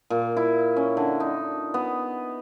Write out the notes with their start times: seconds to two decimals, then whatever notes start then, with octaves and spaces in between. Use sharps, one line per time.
0.10 A#2
0.37 E4
0.76 C#4
0.97 D3
1.20 D#4
1.74 B3